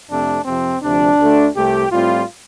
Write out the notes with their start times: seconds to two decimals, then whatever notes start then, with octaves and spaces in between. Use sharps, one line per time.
0.09 F2 C3 A3 C4 D4
0.45 F2 C3 F3 C4
0.82 D2 C3 F3 D4
1.19 D2 D3 A3
1.55 C2 C3 A3 G4
1.91 A2 G3 C4 F4